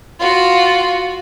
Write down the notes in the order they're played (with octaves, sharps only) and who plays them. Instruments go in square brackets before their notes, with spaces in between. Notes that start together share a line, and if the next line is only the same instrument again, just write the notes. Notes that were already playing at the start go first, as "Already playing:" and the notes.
[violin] F4 F#4